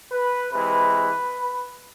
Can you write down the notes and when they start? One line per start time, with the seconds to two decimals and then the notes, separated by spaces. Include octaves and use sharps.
0.12 B4
0.53 C3 E3 G#3 B4